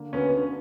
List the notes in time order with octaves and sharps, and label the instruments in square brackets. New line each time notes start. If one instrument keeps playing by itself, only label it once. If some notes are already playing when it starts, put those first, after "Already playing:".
Already playing: [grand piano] D3 A#3
[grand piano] D2 [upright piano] B3 C#4
[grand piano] D3